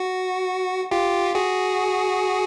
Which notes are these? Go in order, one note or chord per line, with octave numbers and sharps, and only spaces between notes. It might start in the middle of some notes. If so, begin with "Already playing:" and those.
Already playing: F#4
F4 G4
F#4 G#4